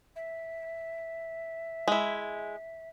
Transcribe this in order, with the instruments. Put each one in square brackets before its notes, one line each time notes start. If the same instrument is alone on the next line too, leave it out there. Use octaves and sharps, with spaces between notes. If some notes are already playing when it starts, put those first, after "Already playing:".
[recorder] E5
[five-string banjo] G#3 E4